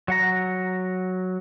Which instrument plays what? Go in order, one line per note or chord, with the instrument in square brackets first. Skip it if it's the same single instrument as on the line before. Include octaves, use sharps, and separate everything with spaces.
[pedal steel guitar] F#3 F#5 A#5